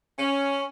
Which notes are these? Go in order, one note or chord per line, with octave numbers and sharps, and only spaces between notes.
C#4